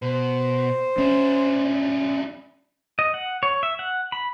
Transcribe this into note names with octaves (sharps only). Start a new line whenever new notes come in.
B2 C5
C#4 D4 E4
D#5
F#5
C#5
E5
F#5
B5